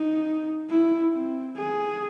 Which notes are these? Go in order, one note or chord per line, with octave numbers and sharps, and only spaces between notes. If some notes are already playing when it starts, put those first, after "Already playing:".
Already playing: D#4
E4
C4
G#4